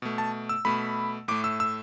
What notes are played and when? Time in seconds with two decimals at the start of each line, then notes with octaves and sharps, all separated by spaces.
0.02 B2 A3
0.18 A5
0.49 E6
0.65 B2 A3 B5
1.28 A2 A3 D6
1.44 E6
1.60 E6